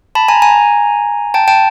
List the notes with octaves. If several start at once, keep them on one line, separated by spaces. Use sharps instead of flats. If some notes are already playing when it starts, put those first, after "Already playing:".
A5 B5
G#5 A#5
G#5 A#5
G5 A5
G5 A5